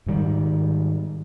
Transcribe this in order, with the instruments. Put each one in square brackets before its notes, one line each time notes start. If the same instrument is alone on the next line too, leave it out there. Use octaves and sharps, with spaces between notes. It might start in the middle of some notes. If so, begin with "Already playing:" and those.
[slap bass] G#2 D#3 G3